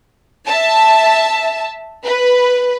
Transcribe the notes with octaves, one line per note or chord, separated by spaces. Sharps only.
E5 A5
B4